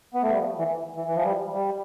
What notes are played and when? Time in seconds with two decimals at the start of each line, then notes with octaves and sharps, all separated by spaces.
0.14 B3
0.23 A3
0.31 G3
0.39 F3
0.58 E3
0.96 E3
1.07 E3
1.15 F3
1.24 G3
1.53 G3